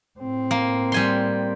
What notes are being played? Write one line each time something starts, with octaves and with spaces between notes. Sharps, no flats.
A2 C4
A#3
G3 G#5 C6